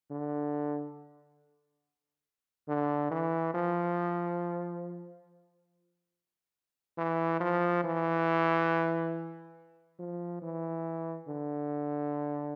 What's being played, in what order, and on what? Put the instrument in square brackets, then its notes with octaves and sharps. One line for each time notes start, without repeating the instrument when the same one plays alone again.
[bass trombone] D3
D3
E3
F3
E3
F3
E3
F3
E3
D3